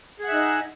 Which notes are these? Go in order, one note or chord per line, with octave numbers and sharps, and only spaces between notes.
D#4 G#4 E5 F#5